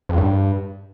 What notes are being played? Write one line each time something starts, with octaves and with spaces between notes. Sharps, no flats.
F2
G2